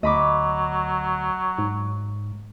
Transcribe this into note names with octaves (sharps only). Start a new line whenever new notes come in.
D2 F#3 D#5 B5 D6
G#2